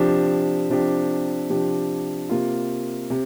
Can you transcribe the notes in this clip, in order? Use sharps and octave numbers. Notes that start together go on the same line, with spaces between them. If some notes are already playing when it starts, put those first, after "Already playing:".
Already playing: C3 F3 D4 G4
C3 F3 D4 G4
C3 F3 D4 G4
C3 A#3 F4
C3